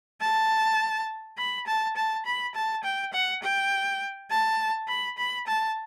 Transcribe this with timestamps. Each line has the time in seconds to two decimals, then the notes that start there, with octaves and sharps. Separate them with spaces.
0.21 A5
1.38 B5
1.67 A5
1.96 A5
2.26 B5
2.55 A5
2.84 G5
3.13 F#5
3.42 G5
4.30 A5
4.88 B5
5.18 B5
5.47 A5